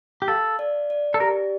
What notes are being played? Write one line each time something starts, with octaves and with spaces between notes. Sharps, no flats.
G4
A4 F5
D5
D5
A4
G4 A#4